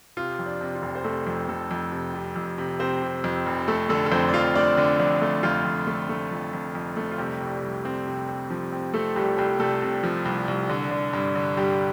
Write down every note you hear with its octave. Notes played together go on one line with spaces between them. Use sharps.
C3 F4
F2
D4
C3
F4
F1
C5
C3 A3 A4
F2
F1 A3 A4
F2
C3
C3
F2
C3
C3 C4 C5
C3
F2
F1
A3 A4
D3 A3 A4
A4
F2 C4 C5
D5
F2 F4 F5
A3 D4 D5
D3
F2 D4
A3
F2 F4
F2
A3
A3
F2
F2
F2
A3
F4
C3 G3 G4
C2
C2
C4
C3
C4
F3
C4
A3 C4 A4
C2 G3 G4
C2 G3 G4
C3 A3 A4
C3
F3
C2
C2
D3
D3
G2
D3
G2 G3 G4